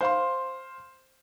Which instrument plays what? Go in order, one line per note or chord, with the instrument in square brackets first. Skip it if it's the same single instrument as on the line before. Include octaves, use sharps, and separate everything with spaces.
[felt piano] C5 F5 C6